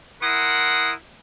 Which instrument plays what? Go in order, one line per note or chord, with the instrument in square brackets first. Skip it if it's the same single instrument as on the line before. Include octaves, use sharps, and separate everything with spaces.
[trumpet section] E4 A#4 F#5 C6 D#6